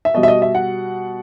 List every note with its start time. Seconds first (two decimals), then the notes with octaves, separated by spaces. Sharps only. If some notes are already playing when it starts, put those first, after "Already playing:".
0.05 E5
0.14 B2 G3 D#5
0.23 E5
0.28 D#5
0.42 E5
0.55 F#5